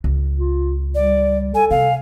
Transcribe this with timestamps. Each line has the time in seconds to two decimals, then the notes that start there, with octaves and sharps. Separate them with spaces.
0.04 C#2
0.39 F4
0.95 G3 D5
1.55 A4 G#5
1.71 C3 F5